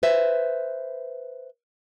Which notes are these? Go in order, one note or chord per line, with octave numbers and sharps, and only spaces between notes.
B4 C5 E5